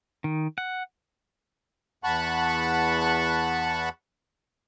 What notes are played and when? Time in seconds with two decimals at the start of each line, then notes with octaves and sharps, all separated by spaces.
0.24 D#3
0.58 F#5
2.04 E2 F#5 A5 B5 C#6 F#6